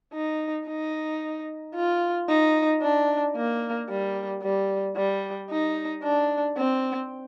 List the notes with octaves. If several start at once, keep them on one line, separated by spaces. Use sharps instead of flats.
D#4
D#4
F4
D#4
D4
A#3
G3
G3
G3
D#4
D4
C4